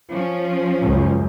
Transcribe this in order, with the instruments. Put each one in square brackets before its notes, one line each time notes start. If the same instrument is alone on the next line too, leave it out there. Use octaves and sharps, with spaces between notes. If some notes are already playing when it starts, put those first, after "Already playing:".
[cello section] F3 C#4
[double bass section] C#2 F#2